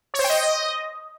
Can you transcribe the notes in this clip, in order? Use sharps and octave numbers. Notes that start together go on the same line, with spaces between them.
C#5
C5
G5
D#5